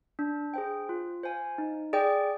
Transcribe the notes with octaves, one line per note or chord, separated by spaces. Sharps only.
D4
G#4 C5 G5
F4
C5 F5 G#5
D#4
G#4 D5 G5